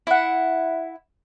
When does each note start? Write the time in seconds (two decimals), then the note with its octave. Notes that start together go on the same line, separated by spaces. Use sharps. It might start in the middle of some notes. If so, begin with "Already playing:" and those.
0.07 E4 F#5